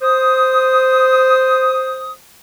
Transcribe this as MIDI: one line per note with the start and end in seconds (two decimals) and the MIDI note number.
0.02 2.13 72
0.02 2.13 87